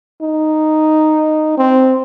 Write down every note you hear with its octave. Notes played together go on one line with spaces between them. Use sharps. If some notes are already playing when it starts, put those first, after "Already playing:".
D#4
C4